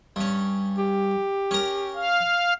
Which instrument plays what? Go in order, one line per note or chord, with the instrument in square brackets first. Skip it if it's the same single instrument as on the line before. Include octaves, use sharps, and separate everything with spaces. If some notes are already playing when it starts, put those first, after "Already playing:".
[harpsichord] G2 C#4
[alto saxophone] G4
[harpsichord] C#4 A#4
[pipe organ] F5